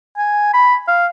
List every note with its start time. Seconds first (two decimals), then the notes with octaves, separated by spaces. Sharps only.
0.17 G#5
0.54 B5
0.88 F5